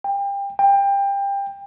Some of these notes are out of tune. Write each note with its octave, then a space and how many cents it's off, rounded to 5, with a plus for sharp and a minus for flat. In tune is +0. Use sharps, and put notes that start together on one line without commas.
G5 +30
G5 +25